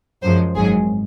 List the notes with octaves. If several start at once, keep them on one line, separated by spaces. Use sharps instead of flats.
F#2 F3 G#3 C5
G#1 G#2 F#3 G#4